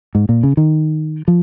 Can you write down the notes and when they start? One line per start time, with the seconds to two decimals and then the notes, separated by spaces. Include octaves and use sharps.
0.15 G#2
0.29 A#2
0.43 C#3
0.57 D#3
1.28 F3